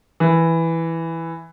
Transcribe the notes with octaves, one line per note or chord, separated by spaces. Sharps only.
E3